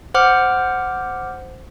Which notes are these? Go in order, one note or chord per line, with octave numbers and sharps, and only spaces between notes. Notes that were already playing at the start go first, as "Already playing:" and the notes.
C5 F#5 D6 F6